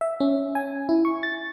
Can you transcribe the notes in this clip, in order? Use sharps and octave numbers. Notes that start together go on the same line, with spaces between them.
E5
C#4
G#5
E4
C#6
A6